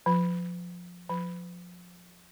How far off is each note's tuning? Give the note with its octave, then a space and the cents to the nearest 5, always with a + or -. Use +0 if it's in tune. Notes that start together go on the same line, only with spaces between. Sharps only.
F3 +20
F3 +25